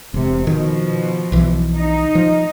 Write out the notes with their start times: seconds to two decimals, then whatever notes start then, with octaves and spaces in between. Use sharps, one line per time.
0.14 E1 C3
0.47 B2 D#3 F3
1.32 B1 E3
1.76 D#4
2.15 F3